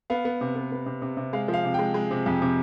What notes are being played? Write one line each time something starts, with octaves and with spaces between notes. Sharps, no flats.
B3 F5
B3
C3
B3
B3
C3
C3
C3
G#3 F5
F3
F5
C3
G#3 G5
G#3
C3
F2
C3